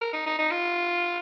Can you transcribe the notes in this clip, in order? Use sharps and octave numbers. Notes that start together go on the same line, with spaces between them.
A#4
D#4
D#4
D#4
F4